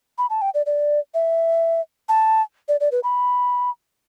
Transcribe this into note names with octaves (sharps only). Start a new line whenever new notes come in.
B5
A5
G5
D5
D5
E5
A5
D5
D5
B4
B5